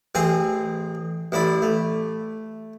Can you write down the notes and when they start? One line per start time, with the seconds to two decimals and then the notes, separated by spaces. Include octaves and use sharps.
0.15 A1 C4 G#4 G#5 C6 D#6
1.32 A1 E4 D5 B5
1.62 A3